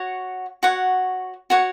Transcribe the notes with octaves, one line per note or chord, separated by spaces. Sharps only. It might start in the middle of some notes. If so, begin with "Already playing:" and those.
Already playing: F#4 C#5 F#5
F#4 C#5 F#5
F#4 C#5 F#5